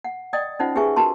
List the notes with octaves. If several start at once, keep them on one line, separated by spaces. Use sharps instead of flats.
F#5
D5 D#5 G5 D#6
C#4 D#4 F4 C5 F#5
G4 G#4 B4 E5 G#5 C#6
F#4 A#4 A5 C6